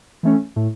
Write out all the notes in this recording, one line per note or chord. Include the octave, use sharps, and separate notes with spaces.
E3 A3 C#4
A2